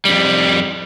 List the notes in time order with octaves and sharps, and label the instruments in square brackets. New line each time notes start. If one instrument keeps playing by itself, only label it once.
[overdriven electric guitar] F2 G3